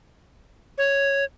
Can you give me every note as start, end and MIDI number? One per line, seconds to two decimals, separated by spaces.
0.78 1.24 73